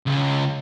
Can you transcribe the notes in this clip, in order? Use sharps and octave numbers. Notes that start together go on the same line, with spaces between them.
C#2